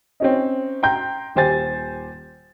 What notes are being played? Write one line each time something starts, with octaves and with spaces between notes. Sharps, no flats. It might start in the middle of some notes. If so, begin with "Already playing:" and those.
C4 C#4 D#4
G5 A#5 C6 G6
D#1 G4 C5 G#5 A6